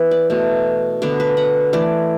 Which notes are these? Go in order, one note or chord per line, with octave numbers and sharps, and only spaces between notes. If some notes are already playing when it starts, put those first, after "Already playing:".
Already playing: E3 B3 B4
D5
B2 A3
D3 B3 D5
B4
F#5
E3 A3 D5